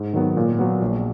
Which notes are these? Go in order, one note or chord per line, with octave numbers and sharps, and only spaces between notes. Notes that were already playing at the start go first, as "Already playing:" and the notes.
Already playing: G#2
D#3 F#3 B3
A#2
F#3 B3
A#1